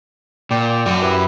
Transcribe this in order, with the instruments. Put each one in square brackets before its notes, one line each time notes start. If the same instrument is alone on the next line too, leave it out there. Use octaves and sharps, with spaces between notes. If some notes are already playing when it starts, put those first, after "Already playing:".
[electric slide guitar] A#2 [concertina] D5 G5
[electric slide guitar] F#2 F#4
[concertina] E4 G4 B4